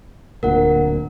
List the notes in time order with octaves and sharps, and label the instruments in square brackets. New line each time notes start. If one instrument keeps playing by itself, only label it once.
[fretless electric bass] D1 D2 A#2 [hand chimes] A#4 F#5